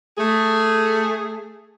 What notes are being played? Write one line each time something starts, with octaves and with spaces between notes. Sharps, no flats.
A3 G#4